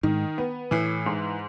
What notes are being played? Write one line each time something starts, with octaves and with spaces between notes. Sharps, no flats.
G#2 D#3
B3
A2 E3
G#2